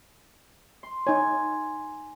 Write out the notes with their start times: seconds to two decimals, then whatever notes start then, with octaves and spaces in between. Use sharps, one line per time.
0.83 C6
1.07 D#4 C#5 G#5